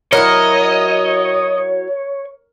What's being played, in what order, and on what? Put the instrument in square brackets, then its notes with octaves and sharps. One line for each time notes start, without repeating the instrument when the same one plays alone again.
[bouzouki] F#3 E4 [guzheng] A#4 [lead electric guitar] C#5 [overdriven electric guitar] D#5